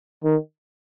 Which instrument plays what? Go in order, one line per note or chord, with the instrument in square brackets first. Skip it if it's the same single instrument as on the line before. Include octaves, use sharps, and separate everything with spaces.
[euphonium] D#3